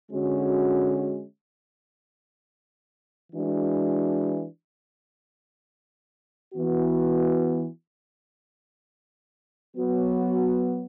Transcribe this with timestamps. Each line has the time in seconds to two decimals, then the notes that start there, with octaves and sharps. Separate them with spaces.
0.11 D3 G#3 C#4 F#4
3.32 E3 G#3 D4 F#4
6.54 E3 B3 F#4
9.75 F#3 B3 F#4